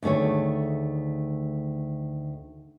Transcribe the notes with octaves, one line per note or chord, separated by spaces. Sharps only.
D2 D#3 A3 G#4 C#5